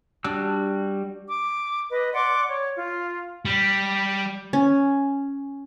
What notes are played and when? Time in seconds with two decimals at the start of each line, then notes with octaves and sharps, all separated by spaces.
0.24 G3 D4 F#4 E6
1.29 D6
1.92 B4 D#5
2.14 D5 F#5 C6 D6
2.47 C#5
2.76 F4
3.45 G3
4.53 C#4